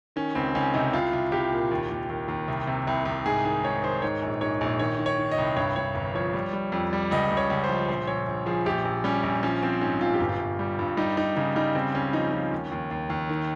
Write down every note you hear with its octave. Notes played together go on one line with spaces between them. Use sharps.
D#3 C#4
C#2 C4
C#2 C#4
C3 D#4
C2 F4
C2
C2 G4
A#2
D#2
D#2
D#2
D#2
C2
C3
C2
C2
G#2 G#4
D#3 G#4
G#2 C#5
D#3 C5
G#2 C#5
A#1
G#2 C#5
A#1
D#3 C#5
D#3
C#5
D#3
D#5
C2
G2 C#5
G2 C#5
G1
F3 C#5
G3
G3
F2
G3
C#2 D#5
C#2
C#5
C#2
C5
F3
A#1 C5
A#1 C#5
A#1
F3 G#4
A#1 G4
A#1
G3 C#4
A#1
F3 C#4
F3 C4
G#2 C#4
A#1 F4
G4
G1
F4
G1
G3
G2
G3 D#4
G3 D#4
C#3 D#4
G3 D#4
C#3 C4
C#2 C#4
F3 D#4
F3 C#4
D#2
D#2
D#2
D#2
D#3